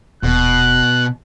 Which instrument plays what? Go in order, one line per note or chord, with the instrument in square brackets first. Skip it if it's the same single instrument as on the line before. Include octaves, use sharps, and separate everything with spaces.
[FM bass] D#1 [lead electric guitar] B2 [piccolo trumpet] F#6